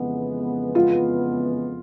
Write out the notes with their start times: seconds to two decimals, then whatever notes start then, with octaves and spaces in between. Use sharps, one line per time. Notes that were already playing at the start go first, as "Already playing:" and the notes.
Already playing: F2 C#3 E3 G#3 B3
0.75 F4